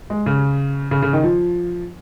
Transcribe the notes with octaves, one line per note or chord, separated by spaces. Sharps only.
G#3
C#3
C#3
C#3
D#3
F3